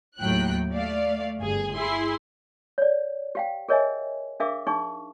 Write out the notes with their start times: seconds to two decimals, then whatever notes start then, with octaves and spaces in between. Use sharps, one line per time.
0.19 D#2 A2 F#3 G5 F#6
0.72 A3 D5 F5
1.39 G1 G#4
1.72 E4 G#4 C6
2.78 C#5 D5
3.35 G4 F5 G5
3.69 G#4 A#4 C#5 D#5 E5 G#5
4.40 D4 G#4 A#4 E5 F5 D6
4.67 D4 D#4 G#4 C#6